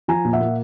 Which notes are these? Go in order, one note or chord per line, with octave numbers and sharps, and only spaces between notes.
F3 G#5 A#5
A#2
E5 F#5
A#3